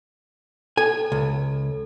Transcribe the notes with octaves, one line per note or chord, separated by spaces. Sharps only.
A4 G#5
C#2